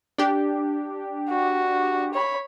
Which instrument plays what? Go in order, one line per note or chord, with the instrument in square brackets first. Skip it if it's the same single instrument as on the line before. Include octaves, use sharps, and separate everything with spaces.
[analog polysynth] D4 G4
[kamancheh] F#4
C#5 B5